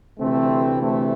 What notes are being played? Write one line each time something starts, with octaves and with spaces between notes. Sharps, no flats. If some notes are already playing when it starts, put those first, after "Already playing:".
D2 C3 E3 A3 C4
A3 C4